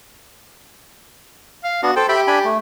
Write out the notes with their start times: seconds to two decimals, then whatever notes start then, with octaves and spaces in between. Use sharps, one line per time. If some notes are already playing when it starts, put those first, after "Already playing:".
1.64 F5
1.83 B3 D4 F#4
1.96 A4 C5 G5
2.09 G4 E5 G5 B5
2.27 D4 G#5 B5
2.45 A3